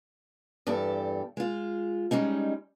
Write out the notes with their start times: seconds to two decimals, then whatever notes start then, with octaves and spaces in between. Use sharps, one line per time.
0.67 E2 G2 G4 A4
1.37 G#3 F4
2.11 G3 G#3 C#4 D#4